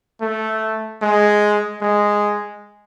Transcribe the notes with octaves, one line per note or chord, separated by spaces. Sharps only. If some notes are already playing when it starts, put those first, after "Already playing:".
A3
G#3
G#3